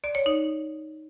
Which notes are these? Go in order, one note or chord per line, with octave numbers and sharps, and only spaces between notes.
D5
C#5
D#4